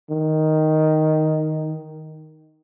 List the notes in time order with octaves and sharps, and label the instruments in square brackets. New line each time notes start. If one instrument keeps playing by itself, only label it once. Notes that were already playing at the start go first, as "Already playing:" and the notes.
[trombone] D#3